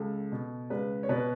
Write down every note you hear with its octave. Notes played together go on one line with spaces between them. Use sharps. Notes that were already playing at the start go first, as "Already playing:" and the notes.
Already playing: C#2 A4
B2
C#2 B4
C#5
B2 B4